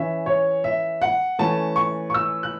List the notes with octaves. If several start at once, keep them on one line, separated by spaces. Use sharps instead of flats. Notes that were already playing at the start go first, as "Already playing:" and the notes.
Already playing: E3 C#4 E5
C#5
E5
F#5
E3 A3 C#4 A5
C#6
C#6
E6
F#6